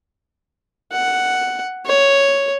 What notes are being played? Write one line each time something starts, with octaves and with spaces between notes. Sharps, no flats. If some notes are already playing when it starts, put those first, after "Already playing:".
F#5
C#5